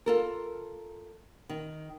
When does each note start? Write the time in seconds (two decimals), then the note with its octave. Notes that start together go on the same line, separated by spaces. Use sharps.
0.06 F4 A4 A#4
1.49 D#3